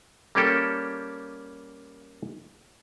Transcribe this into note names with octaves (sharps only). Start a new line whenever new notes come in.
G3 A#3 C#4 G4 A4